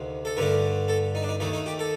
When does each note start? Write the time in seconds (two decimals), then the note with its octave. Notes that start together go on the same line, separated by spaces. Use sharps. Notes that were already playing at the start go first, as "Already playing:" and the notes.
Already playing: D2 C3 D#3 A#3
0.25 A4
0.37 G2 D3 A3 D4 A#4
0.88 A4
1.15 D#4
1.23 D4
1.29 D#4
1.40 D#2 D#3 A3 D#4
1.53 D#4
1.66 G4
1.79 A4